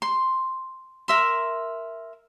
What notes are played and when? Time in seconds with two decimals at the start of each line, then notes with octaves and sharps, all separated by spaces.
0.02 C6
1.08 A#4 E5 C6